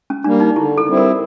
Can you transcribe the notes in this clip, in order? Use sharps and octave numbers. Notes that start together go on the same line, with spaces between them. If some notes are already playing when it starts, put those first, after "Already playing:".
C#4
G3 A#3 D4
D#4
D3 E4
A4
G3 C4 E4
A#4